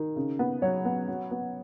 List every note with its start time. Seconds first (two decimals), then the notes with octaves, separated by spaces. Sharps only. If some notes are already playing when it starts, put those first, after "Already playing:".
Already playing: D#3
0.16 C#3
0.39 B3
0.62 F#3 C#5
0.85 B3
1.08 F#3
1.31 B3